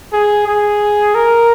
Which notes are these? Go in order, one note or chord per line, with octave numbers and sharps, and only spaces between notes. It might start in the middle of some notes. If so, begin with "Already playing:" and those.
G#4
G#4
A#4